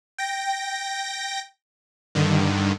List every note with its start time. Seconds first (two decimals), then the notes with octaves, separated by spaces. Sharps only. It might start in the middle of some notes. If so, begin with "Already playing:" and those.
0.18 G5 A#6
2.15 G2 D3 D#3